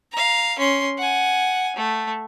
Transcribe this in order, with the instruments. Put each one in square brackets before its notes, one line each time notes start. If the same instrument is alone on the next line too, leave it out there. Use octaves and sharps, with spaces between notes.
[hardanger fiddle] F5 A#5
C#4 C6
F#5 G#5
A3